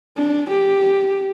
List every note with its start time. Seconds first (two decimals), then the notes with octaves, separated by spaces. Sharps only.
0.17 D4
0.50 G4